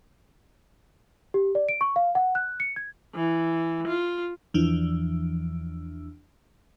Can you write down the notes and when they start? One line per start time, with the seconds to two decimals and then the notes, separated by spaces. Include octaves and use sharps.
1.34 G4
1.55 D5
1.69 D7
1.81 C#6
1.96 F5
2.15 F#5
2.35 F#6
2.60 C#7
2.76 G#6
3.15 E3
3.88 F4
4.54 E2 E3 F3 D4